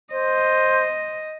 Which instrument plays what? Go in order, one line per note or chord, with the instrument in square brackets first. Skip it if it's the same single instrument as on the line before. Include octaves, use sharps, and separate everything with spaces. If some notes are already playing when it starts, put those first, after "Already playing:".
[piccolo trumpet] C5 [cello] D#5